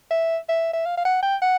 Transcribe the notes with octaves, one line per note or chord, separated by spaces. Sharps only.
E5
E5
E5
F5
F5
F#5
G5
F#5